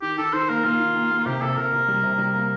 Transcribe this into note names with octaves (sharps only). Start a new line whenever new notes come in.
D#3 G4
D#3 A4
D#3 C5
A#3 A#4
A#3 F4
D#3
A#3
A#3
F4
C3 G4
C3 A4
C3 A#4
C3
G3
C3
G3
A#3